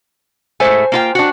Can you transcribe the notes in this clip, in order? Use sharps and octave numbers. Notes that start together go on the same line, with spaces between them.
A2 G#3 A3 C5 G#5
A#3 F4 G5
D4 F#4